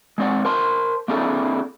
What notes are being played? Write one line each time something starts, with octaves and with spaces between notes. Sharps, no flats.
G#3 C4 D5 F#5
A#4 C5 A5 C6
A#3 C4 D4 E4 G#4 A4